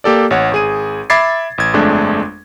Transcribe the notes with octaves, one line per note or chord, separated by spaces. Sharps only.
A#3 G4 A4 D5
A1 C#5 F#5
G#1 G#4 D#7
E5 B5 D6 G#6 A6 C7
A1 G#6
G1 F2 G#3 A3 D4